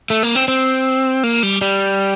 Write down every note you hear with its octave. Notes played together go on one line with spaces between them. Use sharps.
A3
A#3
C4
C4
A#3
G3
G3